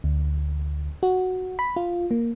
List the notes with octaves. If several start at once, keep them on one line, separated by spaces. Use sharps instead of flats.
D2
F#4
B5
F4
A#3